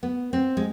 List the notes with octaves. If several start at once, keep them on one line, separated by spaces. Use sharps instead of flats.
B3
C4
G#3